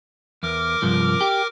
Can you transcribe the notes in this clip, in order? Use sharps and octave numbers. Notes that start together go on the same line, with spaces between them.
E2 A#4 D6 F6
C2 G2 F3
G4